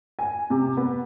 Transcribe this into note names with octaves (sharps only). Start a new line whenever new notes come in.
G#5
C3
B3